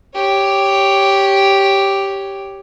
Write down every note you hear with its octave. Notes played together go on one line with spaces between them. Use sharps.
G4 C#5